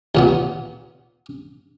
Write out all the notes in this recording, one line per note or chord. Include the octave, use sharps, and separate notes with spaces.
D#2 A#2 B3